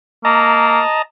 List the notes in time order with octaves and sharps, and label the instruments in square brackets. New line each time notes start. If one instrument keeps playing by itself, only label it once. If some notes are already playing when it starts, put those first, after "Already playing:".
[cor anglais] A#3 [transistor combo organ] D#5 A5 A#5